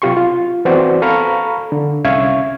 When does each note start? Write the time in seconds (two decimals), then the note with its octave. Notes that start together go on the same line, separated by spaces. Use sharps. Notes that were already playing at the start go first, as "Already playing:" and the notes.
0.02 C3 F#3 F4 G4 C6 C#6
0.17 F4
0.65 E3 B3 C4 F#4 C5 D5
1.02 A4 F5 A#5 B5 C#6 F6
1.72 D3
2.05 C2 C#4 E5 F5 C#6 G#6